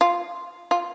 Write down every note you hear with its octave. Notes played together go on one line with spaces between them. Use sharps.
F4
F4